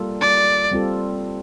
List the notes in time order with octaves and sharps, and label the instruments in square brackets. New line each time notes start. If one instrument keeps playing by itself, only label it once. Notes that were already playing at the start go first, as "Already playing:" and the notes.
Already playing: [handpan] G3 A#3 F4 A4
[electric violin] D5
[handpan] G3 C4 F4 A4